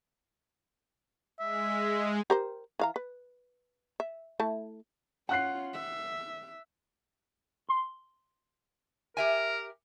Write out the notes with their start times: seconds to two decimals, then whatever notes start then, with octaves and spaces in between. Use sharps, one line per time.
1.40 G#3 E5
2.30 G4 A#4 C5
2.79 E3 F5 A#5
2.96 B4
4.00 E5
4.40 A3 E4 A5
5.29 C#4 F4 F#5 F#6 C7
5.73 E5
7.69 C6
9.17 G4 A#4 E5 G#5